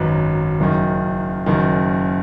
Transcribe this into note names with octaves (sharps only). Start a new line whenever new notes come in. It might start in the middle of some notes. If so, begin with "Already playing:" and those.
Already playing: G#1 F#2 F#3 D#4 B4
F#1 F#2 D#3
F#1 F#2 D#3